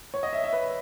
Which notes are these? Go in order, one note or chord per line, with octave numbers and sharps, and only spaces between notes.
C#5
D#5
E5
E5
B4